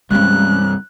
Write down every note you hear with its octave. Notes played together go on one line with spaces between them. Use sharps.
C2 G2 G#3 C#4 F#6